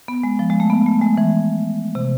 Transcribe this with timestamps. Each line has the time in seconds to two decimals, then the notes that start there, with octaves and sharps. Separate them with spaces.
0.08 B3
0.24 G#3
0.39 F3
0.50 G#3
0.60 A3
0.70 B3
0.86 A3
1.01 G#3
1.18 E3
1.95 C3